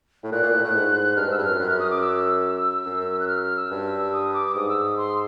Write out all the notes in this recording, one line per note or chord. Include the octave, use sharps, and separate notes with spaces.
A2
A#2 F#6
A#2
A2
A2
G#2
G2 F6
G#2 E6
G2 F#6
F#2 F6
F#2 F#6
F6
D#6
D6
E6
F#2
F#6
F6
F6
E6
G2
D#6
D6
D6
G#2 D#6
E6
D#6
C6